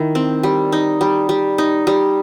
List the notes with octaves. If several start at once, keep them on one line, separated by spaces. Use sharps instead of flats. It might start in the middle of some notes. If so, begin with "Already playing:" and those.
Already playing: D#3 E4
C4
G3
D#4
G3
G3
D#4
G3